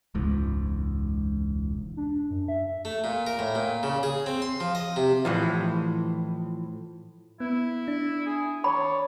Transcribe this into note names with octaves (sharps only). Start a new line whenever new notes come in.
E1 C#2 G#2
D4
F#2
E5
A3
A#2
A#4
A2
A#2
C#3
G#4
C4
C6
F3
D#5
C3
A2 E3 F3
B3 E4
D4
G#4
C#5 D5 B5